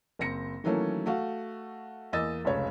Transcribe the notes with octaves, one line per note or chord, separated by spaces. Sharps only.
F#1 C4 A#6 C#7
D#3 E3 F#3 A3 A#3 C#4
A3 F#4 F5
E2 A#3 D#5 E6 A6
F1 C#2 C#3 C#5